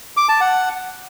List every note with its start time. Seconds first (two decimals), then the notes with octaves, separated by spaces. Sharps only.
0.17 D6
0.29 A5
0.41 F#5